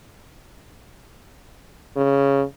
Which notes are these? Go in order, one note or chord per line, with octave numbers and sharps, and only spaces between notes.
C#3